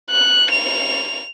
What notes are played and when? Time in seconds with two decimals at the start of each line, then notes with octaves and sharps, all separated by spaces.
0.10 F#6
0.51 F7